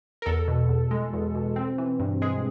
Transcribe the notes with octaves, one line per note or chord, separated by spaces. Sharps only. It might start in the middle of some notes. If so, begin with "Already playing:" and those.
A#4
E2 A4
B2
E2
G#3
E2
B2
C4
E3
G2
G#3 G#4